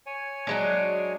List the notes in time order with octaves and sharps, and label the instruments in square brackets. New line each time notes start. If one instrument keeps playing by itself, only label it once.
[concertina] C#5 G#5
[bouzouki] F#3 G#3 D4